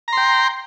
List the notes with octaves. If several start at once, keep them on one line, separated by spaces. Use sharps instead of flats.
G5 A#5 C6